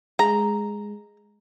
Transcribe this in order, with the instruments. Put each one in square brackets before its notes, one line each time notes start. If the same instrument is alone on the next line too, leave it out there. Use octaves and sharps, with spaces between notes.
[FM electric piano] G#3 [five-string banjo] A#5